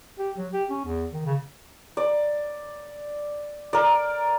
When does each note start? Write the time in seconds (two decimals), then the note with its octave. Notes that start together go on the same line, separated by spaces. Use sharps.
0.19 G4
0.38 F#3
0.53 G4
0.70 C#4
0.85 E2
1.13 D#3
1.26 C#3
1.97 D5
3.73 A#4 D5